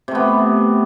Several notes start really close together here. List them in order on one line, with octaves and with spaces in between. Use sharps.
C3 A3 B3